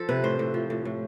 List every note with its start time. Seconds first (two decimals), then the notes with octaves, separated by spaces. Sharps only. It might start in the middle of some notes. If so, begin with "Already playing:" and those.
Already playing: F3 F4 A4
0.09 C3 B4
0.24 A2 C5
0.39 A2
0.54 F3
0.70 A2
0.85 A2